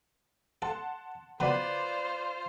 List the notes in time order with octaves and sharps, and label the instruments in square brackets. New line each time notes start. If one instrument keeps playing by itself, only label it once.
[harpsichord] A4 [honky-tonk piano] F#5 A5 C6
[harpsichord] C#3 F#3 B3 [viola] F4 C5 [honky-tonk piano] B4 D5